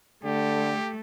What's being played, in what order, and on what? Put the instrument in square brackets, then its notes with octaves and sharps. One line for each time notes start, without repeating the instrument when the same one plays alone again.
[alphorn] D3 [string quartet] A3 [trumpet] G4